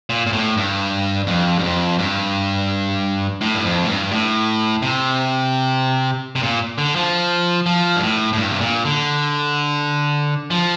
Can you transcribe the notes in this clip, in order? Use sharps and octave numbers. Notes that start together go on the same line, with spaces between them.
A#2
A#2
A2
G2
F2
G2
F2
G2
A2
G2
F2
A2
G2
A2
C3
C3
A#2
D3
F3
F3
G2
A2
A2
G2
C3
A#2
D3
F3